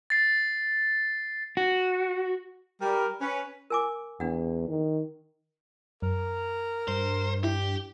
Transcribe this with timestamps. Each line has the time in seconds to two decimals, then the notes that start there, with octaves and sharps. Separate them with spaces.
0.10 A6 C7
1.57 F#4
2.82 G3 A#4
3.21 C#4 B4
3.70 A#4 G#5 D6
4.20 E2 D4 F#5
4.69 D#3
6.02 F#2 A#4
6.88 G2 C5
7.44 E4 G4